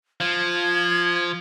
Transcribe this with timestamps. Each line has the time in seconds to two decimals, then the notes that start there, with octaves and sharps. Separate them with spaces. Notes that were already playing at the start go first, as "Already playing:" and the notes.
0.20 F3 G#6